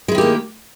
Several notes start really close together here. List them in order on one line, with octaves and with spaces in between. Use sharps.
G#3 E4 D#3 G4 A#3